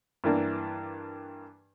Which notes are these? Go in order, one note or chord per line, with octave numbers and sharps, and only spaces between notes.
G2 E3 A#3 D4